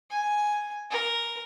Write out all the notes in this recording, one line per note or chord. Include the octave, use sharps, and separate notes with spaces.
G#5
A#4